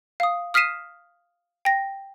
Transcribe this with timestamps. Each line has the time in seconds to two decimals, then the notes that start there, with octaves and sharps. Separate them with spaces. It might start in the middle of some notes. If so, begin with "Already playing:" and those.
0.20 F5 D#6
0.54 D#6 F6 B6 C7 D#7 E7
1.65 G5 A#6